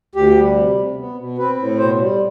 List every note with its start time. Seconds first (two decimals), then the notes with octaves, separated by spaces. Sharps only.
0.15 D2 G4
0.37 G3
0.57 C3
0.77 C3
0.98 B3
1.17 B2
1.38 C4 B4
1.59 A2
1.78 B2 C5
1.99 G3